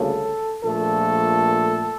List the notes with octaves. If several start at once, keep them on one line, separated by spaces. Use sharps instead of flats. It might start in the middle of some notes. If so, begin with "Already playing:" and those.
Already playing: D2 C#3 G3 A#3 A4
A#1 A#2 A3 A4